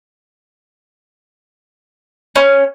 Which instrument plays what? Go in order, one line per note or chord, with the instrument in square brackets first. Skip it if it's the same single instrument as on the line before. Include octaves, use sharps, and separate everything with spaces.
[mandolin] C#4